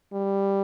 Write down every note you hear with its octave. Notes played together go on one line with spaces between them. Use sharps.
G3